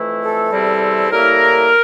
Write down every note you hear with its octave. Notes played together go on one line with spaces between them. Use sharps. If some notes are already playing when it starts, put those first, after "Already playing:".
Already playing: F2 E3 A3 E4
A4
E2 C3 G3 C4 E4
A2 G3 A#3 E4 A#4